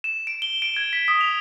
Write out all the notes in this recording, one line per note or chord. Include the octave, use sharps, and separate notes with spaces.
E7
D7
G7
D7
G#6
B6
D#6
F7